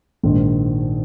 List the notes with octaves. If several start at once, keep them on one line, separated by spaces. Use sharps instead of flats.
A#1 G#2 D#3